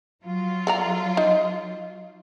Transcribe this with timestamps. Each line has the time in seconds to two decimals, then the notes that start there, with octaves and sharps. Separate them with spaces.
0.24 F#3 F4
0.67 A4 D5 A#5
1.17 D#4